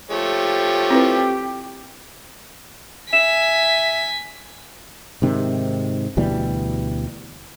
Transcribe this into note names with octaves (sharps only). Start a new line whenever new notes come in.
F3 A3 G4 C#5
C4 E4 B4
E5 G#5 B6 E7
G#2 C3 D#3
D2 B2 E3 G3